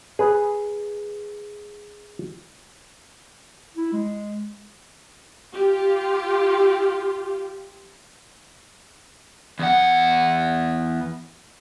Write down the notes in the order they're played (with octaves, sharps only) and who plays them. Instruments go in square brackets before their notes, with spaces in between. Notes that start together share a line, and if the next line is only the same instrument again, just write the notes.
[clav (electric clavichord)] G#4 B4
[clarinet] E4
G#3
[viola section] F4 G4
[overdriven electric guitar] E2 F#5